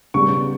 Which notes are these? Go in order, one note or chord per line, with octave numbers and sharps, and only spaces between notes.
C#3 G3 B3 C#6